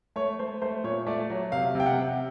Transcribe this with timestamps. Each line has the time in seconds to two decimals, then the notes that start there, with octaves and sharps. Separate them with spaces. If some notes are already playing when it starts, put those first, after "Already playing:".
0.16 A3 C#5
0.39 A3 C5
0.62 A3 C5
0.84 A#2 C#5
1.07 A3 D5
1.30 F#3
1.52 C3 F5
1.75 C3 G5
1.86 F#5
1.98 C3